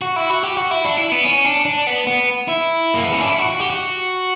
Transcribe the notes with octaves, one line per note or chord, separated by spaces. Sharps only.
F#4
E4
F#4
G4
F#4
E4
D4
E4
B3
C#4
D4
D4
B3
B3
E4
A#3
B3
C#4
D4
E4
F#4
F#4
G4
F#4